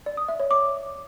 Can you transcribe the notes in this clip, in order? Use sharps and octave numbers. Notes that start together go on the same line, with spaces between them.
D5
D#6
E5
C#5
D6